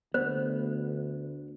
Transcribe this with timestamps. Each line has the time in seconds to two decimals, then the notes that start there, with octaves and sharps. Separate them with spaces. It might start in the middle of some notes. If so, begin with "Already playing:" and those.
0.14 D2 B3 C5